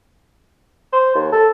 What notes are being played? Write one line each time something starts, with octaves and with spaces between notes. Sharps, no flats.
C5
D#2
A4